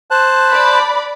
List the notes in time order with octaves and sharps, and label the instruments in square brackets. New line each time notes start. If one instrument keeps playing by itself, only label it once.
[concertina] C5 A5 F#6
[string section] D5 B5